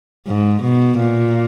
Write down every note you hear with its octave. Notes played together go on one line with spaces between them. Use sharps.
G#2
B2
A#2